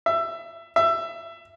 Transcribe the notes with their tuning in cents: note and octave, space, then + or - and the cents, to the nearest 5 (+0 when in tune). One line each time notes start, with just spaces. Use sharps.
E5 +20
E5 +20